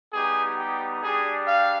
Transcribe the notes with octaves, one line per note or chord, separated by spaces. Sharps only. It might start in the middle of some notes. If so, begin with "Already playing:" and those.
G3 B3 D#4 G4 G#4
G4
G3 D4 G4 G#4
F5